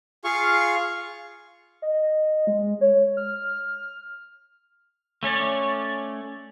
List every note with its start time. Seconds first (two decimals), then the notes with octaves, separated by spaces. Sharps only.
0.24 F4 G#4 F5 C#6
1.82 D#5
2.47 G#3
2.81 C#5
3.17 F6
5.23 A3 C#4 C#5 D5